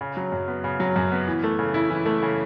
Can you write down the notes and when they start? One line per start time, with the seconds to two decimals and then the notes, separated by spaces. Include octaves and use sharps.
0.01 C#3
0.17 F#3
0.32 F#2
0.48 B3
0.64 C#3
0.80 F#3
0.96 F#2
1.12 B3
1.28 E3
1.43 A3
1.59 C#3
1.74 E4
1.90 E3
2.06 A3
2.22 C#3